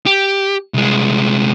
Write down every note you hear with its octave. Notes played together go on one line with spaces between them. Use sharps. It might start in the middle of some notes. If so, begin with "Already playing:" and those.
G4
C2 G#3